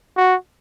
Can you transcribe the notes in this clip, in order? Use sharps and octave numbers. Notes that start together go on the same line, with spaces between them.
F#4